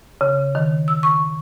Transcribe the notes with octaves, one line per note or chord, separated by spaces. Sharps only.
C#3
D#3
E6
C#6